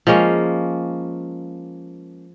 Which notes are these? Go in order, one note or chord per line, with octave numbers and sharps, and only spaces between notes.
F3 G#3 A#3 C#4